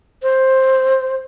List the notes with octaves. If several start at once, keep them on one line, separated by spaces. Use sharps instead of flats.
C5